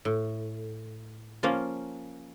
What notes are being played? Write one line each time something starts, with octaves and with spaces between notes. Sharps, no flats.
A2
F3 A#3 C#4 F4